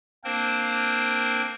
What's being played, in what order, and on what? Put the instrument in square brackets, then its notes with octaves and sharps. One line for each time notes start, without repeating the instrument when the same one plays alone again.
[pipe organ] A#3 C4 D4 A#4 C5